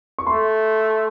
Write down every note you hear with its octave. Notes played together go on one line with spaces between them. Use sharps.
C#6
A3 C6